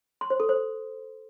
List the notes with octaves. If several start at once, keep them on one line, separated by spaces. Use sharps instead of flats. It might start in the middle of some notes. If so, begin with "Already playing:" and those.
C6
C5
A4
C5